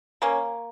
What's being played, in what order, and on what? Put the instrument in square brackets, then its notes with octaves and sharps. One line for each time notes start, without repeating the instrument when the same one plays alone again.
[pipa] A#3 C#4